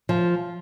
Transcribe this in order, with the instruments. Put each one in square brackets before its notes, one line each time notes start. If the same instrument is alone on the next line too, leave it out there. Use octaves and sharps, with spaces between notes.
[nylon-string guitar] F3